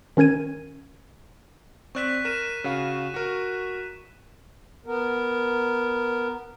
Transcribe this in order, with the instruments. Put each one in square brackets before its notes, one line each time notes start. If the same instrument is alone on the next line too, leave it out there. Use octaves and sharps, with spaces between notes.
[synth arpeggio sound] D#3 C#4 A#4 G#6 D#7
[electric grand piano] C4 D5 E7 [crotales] C#6 F#6 B6
[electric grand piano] A#4 [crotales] D#7 E7
[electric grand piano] C#3 F#4 F5
F#4 A#4
[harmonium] B3 A#4